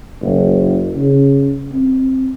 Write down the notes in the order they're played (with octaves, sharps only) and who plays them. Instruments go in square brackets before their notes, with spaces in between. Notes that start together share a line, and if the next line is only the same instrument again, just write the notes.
[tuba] F#1
C#3
C4